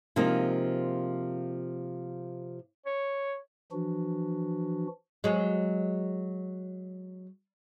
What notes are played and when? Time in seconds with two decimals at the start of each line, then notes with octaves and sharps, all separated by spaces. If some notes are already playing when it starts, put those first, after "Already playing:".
0.16 C3 F3 G#3 A#3 D#4
2.86 C#5
3.71 E3 F3 D4 F#4
5.24 F#3 G#3